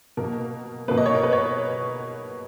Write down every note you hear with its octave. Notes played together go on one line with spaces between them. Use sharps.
B2 A#3 A#4
B2 A#3 B4
D#5
C#5
A#4
B4
C#5